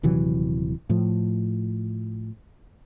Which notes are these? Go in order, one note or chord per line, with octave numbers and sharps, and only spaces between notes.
D#1 C3 E3 F#3
A2 F3